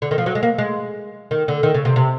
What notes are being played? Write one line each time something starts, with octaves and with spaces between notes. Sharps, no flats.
D3
D#3
F3
F#3
G#3
A#3
G#3
D#3
D3
D#3
C#3
C3
C3